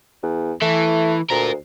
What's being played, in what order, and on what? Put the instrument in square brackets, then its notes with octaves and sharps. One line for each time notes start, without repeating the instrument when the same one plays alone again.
[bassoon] E2
[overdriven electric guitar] E3 [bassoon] A3
[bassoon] D2 [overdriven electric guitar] F4 A#4